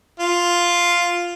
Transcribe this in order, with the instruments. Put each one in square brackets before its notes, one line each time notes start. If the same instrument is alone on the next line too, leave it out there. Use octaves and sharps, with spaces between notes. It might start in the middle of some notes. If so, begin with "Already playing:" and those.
[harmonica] F4